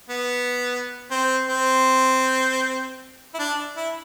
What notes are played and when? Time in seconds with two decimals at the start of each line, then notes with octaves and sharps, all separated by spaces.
0.09 B3
1.11 C4
1.48 C4
3.34 E4
3.39 D4
3.76 E4